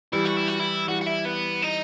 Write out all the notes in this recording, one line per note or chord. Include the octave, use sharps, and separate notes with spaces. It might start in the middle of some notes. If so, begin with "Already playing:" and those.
E3 G3 E4
F#4
E4
F#4
E4
E3 G3 F#4
F#4
E4
B3
D#4